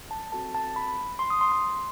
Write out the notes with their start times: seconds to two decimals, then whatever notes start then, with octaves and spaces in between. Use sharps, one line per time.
0.11 A5
0.32 C4 F#4 A4 A5
0.55 A5
0.76 B5
1.19 C6
1.30 D#6
1.41 C6
1.52 C6